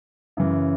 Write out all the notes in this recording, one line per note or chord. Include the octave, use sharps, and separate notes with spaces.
F#2 C#3 E3